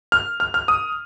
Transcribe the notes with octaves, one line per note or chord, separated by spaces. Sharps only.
F6
F6
F6
D#6